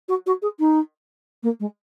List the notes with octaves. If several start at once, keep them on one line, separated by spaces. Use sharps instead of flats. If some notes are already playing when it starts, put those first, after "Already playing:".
F#4
F#4
G#4
D#4
A#3
G#3